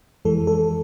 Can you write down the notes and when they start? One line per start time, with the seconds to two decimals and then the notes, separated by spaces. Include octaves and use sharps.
0.25 F2 E3 G#3 A4
0.47 A4